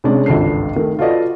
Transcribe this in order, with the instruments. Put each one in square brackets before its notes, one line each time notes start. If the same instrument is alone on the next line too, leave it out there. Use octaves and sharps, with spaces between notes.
[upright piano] C3 G#3 C#4 D4
G#1 C#2 G2 A4 C7
D#3 A3
F4 F#4 A4 B4 D5 D#5